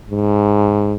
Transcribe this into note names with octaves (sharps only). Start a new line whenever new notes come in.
G#2